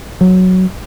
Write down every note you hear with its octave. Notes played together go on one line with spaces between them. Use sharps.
F#3